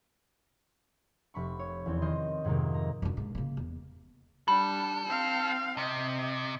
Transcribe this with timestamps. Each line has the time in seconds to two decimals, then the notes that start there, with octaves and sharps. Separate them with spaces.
1.34 F1 B5 C#6
1.59 C#5
1.86 E2 C4 D#4
2.02 D#3 D#5 C6 G6
2.44 F2 G#2 C3 D#3 A#3
2.74 A#5
3.02 F#2 D3
3.17 G#2
3.35 C#3 A#3
3.57 E2
4.48 G3 D4 A4 B5
5.06 C4 F5
5.78 C3 D#5